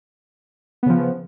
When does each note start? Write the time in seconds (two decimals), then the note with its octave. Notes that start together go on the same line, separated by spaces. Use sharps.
0.83 B3
0.86 C#3
0.89 F3